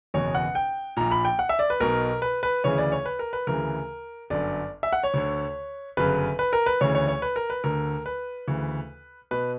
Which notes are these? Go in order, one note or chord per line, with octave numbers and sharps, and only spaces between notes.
F#1 E2 B2 C#5
F#5
G5
A#1 A#2 A#5
B5
G5
F#5
E5
D5
B4
B1 B2 A#4
B4
B4
D2 C#3 E3 C#5
D5
C#5
B4
A#4
B4
D2 C#3 E3 A#4
G1 F#2 D3 D5
E5
F#5
C#5
D2 D3
G1 F#2 C#3 B4
B4
A#4
B4
D2 C#3 E3 C#5
C#5
C#5
B4
A#4
B4
D2 D3 A#4
B4
D2 C#3 E3
B2 B4